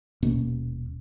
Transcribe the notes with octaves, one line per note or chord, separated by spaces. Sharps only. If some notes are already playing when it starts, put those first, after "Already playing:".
D#1 B2 A#3 C#4